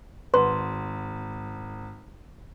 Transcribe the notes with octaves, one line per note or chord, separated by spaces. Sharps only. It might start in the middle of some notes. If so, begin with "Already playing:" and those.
G#1 B4 F#5 C6